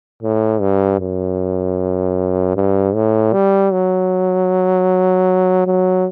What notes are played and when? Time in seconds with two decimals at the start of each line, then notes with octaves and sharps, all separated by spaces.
0.23 A2
0.61 G2
1.00 F#2
2.56 G2
2.95 A2
3.33 G3
3.72 F#3
5.67 F#3